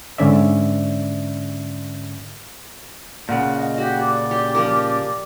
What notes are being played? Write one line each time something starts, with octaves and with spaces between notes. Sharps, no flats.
G#2 D3 C#4 D5 E5
A#2 C#3 F#5
D#5
F#4 G4
D5
G4
F3 G4 A#4